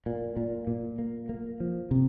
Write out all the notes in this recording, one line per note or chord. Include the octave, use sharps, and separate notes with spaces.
A#2
A#2
A#2
A#3
A#3
F3
C3